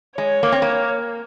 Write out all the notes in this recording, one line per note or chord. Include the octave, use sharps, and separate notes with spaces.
G#3 C#5
A#3
C4
A#3